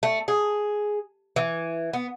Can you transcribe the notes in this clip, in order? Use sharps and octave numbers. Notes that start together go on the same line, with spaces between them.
A3
G#4
E3
B3